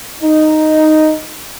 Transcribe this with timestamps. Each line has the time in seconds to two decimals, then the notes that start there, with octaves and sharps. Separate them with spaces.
0.20 D#4